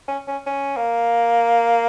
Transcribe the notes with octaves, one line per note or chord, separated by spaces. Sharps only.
C#4
C#4
C#4
A#3